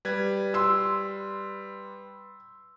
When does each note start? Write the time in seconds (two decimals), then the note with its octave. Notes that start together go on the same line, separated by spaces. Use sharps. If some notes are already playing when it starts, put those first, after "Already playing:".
0.05 G3 B4 G#6
0.54 C6 E6